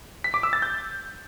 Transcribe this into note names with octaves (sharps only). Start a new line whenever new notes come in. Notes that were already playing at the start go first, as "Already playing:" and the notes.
B6
D6
E6
A6
G6